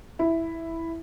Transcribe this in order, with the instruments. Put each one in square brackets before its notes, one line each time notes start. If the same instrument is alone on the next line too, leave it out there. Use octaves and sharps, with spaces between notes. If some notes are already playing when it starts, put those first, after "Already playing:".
[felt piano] E4